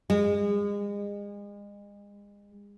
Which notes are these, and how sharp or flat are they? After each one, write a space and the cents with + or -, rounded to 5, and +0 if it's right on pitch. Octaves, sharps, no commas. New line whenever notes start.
G#3 -35